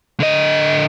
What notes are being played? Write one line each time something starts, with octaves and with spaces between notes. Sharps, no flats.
D3 D#5